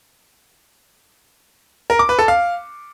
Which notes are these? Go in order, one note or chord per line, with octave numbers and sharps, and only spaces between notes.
A#4
D6
B4
A4
F5